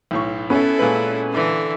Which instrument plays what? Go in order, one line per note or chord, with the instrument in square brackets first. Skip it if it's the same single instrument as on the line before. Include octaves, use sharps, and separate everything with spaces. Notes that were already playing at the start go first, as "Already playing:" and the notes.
[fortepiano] B1 A2 C#6
[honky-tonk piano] B3 C#4 [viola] E4 A4
[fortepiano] A#2 G#3 B4
[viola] D3 E3